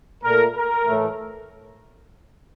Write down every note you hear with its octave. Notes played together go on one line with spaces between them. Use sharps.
A#2 A3 A#4
A#4
A2 E3 A3